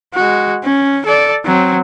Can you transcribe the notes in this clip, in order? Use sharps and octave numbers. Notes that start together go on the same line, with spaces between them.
G#3 F#4
C#4
A4 D5
F#3 C4